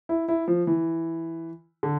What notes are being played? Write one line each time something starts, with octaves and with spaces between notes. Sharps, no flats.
E4
E4
F3
E3
D3